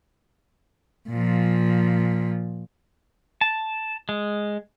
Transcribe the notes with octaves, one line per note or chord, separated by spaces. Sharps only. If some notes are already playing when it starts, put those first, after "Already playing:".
A#2 F3
A5
G#3